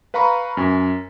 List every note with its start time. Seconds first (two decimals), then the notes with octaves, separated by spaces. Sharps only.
0.14 B4 F5 A#5 B5 C#6
0.57 F#2 G#5